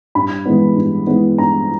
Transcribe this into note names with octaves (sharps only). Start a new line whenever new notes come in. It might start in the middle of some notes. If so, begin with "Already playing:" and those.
G2 B5
E3 G#3 B3
G2
E3 G#3 B3
G2 A#5